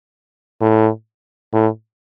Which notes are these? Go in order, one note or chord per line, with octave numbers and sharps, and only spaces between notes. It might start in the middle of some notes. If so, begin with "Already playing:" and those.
A2
A2